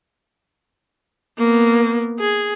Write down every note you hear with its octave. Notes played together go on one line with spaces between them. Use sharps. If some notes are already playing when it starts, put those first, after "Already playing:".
A#3 B3
G#4